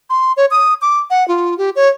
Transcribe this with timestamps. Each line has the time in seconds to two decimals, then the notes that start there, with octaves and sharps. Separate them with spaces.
0.10 C6
0.37 C#5
0.51 D#6
0.82 D6
1.10 F#5
1.28 F4
1.58 G4
1.76 C#5